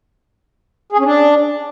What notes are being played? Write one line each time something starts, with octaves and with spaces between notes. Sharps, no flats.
G#4
C#4
D4